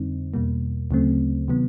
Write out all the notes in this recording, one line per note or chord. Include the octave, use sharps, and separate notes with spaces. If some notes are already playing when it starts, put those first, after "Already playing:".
Already playing: F2 D3 G3 C4 D#4
E2 B2 G3 A#3
D2 C#3 F#3 A3 C4
C3 D#3 F#3 B3